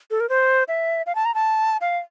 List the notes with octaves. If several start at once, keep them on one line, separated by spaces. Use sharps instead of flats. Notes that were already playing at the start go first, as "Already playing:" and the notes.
A4
A#4
C5
E5
F5
A5
A#5
A5
F5